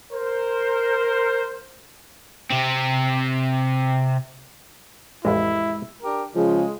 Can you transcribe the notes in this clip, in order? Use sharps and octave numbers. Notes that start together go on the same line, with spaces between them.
A#4 C5
C3 C4
A1 F2 G#3 E4
D4 G4 A#4
C#3 F3 G#3